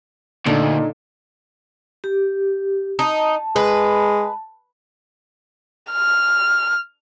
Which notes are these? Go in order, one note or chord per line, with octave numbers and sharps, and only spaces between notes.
D2 A#2 D3 D#4
G4
D#4 A5
G#3 B4
F6